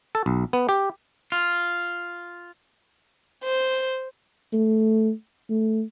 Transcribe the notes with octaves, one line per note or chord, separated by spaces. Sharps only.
A4
B1
B3
G4
F4
C5
A3
A3